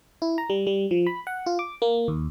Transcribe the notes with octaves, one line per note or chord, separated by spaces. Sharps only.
E4
A#5
G3
G3
F3
B5
F#5
F4
D6
A#3
D#2